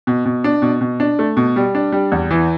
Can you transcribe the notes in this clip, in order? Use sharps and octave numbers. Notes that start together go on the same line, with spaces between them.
B2
B2
D4
B2
B2
D4
A3
B2
G3
D4
G3
E2
E3